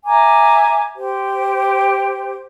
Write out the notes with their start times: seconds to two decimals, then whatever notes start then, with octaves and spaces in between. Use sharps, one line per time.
0.06 E5 G#5 A#5 D6
0.96 G4 C5